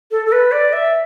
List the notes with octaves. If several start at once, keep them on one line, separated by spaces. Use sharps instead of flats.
A4
A4
B4
D5
E5